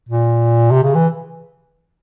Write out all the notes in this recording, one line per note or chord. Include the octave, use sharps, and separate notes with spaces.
A#2
C3
C#3
E3